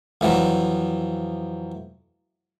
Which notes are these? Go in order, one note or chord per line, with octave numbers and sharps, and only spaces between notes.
F2 E3 F#3